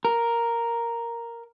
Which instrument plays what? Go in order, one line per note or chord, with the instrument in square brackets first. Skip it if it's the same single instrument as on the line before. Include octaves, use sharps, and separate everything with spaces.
[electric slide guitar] A#4